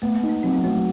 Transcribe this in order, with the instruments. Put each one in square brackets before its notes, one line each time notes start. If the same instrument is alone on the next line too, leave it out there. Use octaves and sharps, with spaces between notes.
[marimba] A3 [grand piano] B3
[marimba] A#3
[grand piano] D#4
[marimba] B3
[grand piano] F#3 [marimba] C4
[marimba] B3
[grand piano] F#3 [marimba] A3